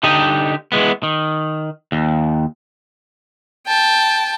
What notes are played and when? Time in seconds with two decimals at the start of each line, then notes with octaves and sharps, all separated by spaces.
0.03 D3 D#4 G4 D#5
0.72 E3 F3 G#3 B3
1.03 D#3
1.92 D#2
3.67 G5 A5